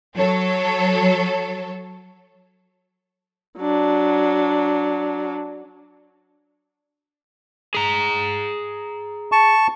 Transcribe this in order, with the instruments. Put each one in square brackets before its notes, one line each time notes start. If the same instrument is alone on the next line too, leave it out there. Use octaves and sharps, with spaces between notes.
[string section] F#3 A4 C#5
[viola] F#3 D4
[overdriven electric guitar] G#4 A#5
[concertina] A5 C#6